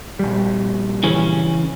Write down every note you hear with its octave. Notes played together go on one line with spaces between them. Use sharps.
A#1 G3
C#3 E3 C#4